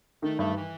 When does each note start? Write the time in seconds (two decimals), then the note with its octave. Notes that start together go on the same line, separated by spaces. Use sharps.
0.23 D#3 A3
0.39 G2 A3
0.54 E3